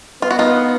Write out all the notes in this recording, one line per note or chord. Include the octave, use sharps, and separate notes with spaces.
B3 F4
F#4
D#4 F4